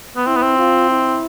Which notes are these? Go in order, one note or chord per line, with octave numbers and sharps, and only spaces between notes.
B3
C4 E4
B3
C4
F4
E4